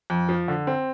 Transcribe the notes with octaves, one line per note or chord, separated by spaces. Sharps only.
F2
F3
D3
C4